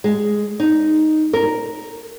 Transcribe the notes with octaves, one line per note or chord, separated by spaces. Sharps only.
G#3
D#4
A#4